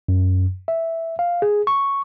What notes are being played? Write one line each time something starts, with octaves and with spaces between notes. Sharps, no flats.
F#2
E5
F5
G#4
C#6